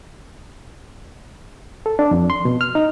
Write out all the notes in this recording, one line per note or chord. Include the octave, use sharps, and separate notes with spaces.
A4
D4
F2
C6
B2
F6
D#4